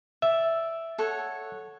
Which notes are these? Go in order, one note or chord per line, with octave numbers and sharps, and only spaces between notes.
D5 E5
A4 C#5 F#5